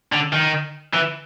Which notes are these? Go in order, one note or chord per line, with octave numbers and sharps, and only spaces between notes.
D3
D#3
E3